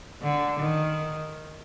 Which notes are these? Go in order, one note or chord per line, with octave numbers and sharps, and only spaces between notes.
D3
D#3